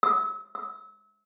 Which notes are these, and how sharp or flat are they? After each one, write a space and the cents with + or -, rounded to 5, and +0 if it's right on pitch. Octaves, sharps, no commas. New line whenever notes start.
E6 -35
E6 -30